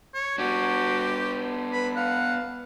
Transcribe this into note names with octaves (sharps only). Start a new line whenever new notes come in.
C#5
B3 D4 F#4 G4
B4 B5
F5 F#5